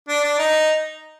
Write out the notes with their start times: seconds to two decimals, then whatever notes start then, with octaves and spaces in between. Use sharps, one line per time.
0.08 D4
0.24 D4
0.39 D#4